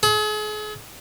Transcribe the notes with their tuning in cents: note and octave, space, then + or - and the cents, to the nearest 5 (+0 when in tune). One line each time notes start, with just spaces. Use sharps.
G#4 +40